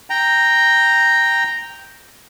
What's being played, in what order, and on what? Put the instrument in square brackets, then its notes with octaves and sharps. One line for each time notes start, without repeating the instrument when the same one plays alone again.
[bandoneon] G5 A#5